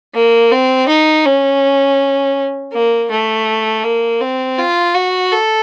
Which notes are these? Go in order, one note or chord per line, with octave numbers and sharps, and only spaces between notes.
A#3
C4
D#4
C#4
A#3
A3
A#3
C4
F4
F#4
A4